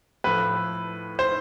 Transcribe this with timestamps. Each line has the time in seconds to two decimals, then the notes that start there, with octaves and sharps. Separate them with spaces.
0.24 A2 F3 A3 B4
1.19 C5